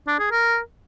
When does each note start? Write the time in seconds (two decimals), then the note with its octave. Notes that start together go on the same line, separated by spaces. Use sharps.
0.07 D4
0.19 G#4
0.31 A#4